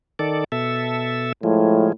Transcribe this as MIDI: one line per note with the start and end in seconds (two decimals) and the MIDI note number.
0.19 0.44 51
0.19 0.44 69
0.19 0.44 74
0.52 1.32 47
0.52 1.32 69
0.52 1.32 76
1.43 1.89 45
1.43 1.92 53
1.43 1.92 56